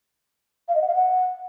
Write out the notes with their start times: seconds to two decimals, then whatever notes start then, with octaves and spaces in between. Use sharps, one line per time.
0.68 F5
0.75 D#5
0.81 F#5
0.88 F5
0.94 F#5